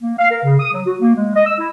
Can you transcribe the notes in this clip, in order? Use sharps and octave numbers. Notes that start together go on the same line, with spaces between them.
A#3
F5
A#4
C#3
D#6
F#3
F#4
A#3
G#3
D#5
E6
E4